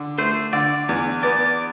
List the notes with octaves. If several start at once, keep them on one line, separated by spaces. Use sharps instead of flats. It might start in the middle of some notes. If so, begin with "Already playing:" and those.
Already playing: D3
A3 C5
D3 D5
E2
B3 D5